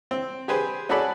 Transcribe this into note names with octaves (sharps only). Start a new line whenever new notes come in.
C4
G4 G#4 B4 C5
C#4 F#4 G#4 A4 D5 B5